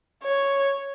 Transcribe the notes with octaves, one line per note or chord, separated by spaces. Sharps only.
C#5